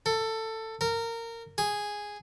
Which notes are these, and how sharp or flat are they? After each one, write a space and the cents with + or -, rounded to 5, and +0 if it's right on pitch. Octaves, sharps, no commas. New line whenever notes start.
A4 +15
A#4 -20
G#4 -5